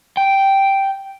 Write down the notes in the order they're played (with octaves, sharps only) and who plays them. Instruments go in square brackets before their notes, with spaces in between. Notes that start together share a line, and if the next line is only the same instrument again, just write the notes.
[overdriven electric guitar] G5